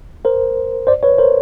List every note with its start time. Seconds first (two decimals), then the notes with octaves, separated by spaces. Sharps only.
0.25 A#4 C5
0.87 C5 D5
1.03 B4 C#5
1.18 A#4 C5